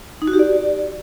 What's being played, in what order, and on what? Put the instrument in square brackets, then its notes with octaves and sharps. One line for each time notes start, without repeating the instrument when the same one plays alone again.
[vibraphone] D#4
F#4
G4
D5